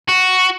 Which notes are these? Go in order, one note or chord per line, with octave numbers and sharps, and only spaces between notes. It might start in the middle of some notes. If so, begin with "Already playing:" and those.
F#4